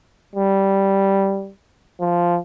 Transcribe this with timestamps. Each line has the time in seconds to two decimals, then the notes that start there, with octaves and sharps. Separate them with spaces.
0.35 G3
2.00 F3